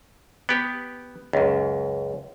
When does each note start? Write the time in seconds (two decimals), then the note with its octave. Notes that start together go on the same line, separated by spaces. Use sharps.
0.49 B3 G4
1.33 C#2 F#2